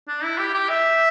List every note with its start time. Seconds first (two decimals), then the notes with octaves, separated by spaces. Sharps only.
0.08 D4
0.24 E4
0.38 G4
0.54 G4
0.69 E5